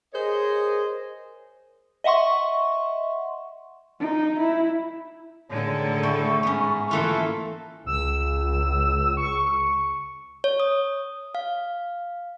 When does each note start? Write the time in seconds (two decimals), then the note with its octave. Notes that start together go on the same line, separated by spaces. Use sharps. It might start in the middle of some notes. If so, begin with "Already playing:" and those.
0.14 G#4 A#4 C5 C#5 D#5
2.04 D#5 E5 F#5 C6 C#6
4.00 D#4
4.40 E4
5.50 A2 D3 D#3 G#3 A4 C#5
6.03 E4 G5 C#6
6.43 G#2 B3 C#4
6.91 E3 A3 A#3 E4 F4 A4
7.86 C#2 E6
9.17 C#6
10.44 C#5
10.60 D#6
11.35 F5